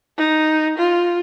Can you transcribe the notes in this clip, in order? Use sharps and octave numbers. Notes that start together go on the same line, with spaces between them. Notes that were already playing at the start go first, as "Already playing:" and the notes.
D#4
F4